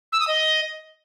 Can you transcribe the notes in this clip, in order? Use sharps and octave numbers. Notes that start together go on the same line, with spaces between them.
E6
D#6
D#5